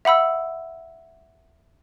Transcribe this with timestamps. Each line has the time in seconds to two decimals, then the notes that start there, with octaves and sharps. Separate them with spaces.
0.05 E5 F#5 B5 E6